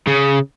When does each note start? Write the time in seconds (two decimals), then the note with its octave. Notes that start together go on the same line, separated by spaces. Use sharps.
0.07 C#3